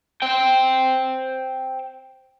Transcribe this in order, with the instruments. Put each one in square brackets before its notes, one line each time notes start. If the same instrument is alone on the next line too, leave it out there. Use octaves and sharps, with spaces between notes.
[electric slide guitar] C5 G5